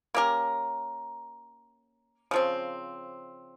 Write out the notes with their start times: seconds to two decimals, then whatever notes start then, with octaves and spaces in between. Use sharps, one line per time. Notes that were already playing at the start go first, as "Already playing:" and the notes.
0.14 A#3 C#4 G4 A#4
2.31 C#3 F3 C4